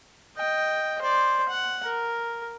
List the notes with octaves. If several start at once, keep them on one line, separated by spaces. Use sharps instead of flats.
D#5 G5
C5 D5
F#5
A#4